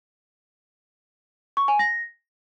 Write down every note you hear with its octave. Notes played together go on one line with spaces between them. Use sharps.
C#6
G#5
A#6